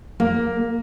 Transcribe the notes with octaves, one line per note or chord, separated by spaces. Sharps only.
A#3